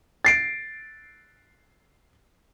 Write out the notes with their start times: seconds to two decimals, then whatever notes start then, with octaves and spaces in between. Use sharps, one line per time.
0.25 A6 C7 D7